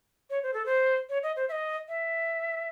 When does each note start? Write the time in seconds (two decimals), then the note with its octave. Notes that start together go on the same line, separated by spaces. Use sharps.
0.30 C#5
0.43 C5
0.54 A4
0.66 C5
1.09 C#5
1.23 D#5
1.36 C5
1.49 E5
1.52 D#5
1.88 E5